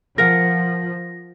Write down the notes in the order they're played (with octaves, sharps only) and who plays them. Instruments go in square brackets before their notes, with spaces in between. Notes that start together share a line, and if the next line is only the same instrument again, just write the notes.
[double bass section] F3 [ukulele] A#4 F#5 [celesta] A#6